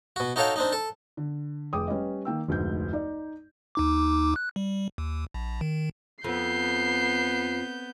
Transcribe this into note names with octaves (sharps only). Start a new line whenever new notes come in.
B2 F#4
D#4 F#4 A4 C#5 F5 G5
C4 D4 D#4
A4
D3
F1 G#4 G5 D6 D#6
G3 C#4 B4 D#5
D#3 A#3 G5 E6
F1 D2 G#2 G6
D#4 D5
D#2 D#4 D6
F#6
G3
D#2
A#1
D#3
F2 B3 G6 C7